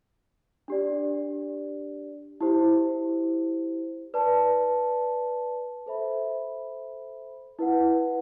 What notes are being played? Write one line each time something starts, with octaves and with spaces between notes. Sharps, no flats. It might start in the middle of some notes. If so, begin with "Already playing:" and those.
D4 G4 D5
E4 G4 C5
B4 D5 A5
A4 C5 E5 B5
E4 B4 F#5